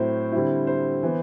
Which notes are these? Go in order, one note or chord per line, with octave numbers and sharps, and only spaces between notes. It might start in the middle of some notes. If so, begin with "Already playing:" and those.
Already playing: A2 F#3 C4 E4 C5
D3 G3 C4 E4
C5
E3 B3